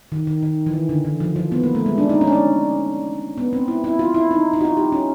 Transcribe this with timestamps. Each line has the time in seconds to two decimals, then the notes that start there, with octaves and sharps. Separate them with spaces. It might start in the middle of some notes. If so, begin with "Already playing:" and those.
0.12 D#3
0.27 D#3
0.43 D#3
0.66 E3
0.74 D#3
0.89 D3
1.05 D#3
1.20 F3
1.36 F3
1.52 B3
1.63 A#3
1.75 A3
1.86 G#3
1.98 D4
2.09 D#4
2.21 C#4
2.27 D4
2.33 C#4
3.38 B3
3.53 C4
3.68 E4
3.84 E4
3.99 F4
4.14 E4
4.31 D#4
4.53 D#4
4.61 F#4
4.65 F4
4.77 G4
4.92 C#4